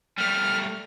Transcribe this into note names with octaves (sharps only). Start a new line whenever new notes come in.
G3 A3 F6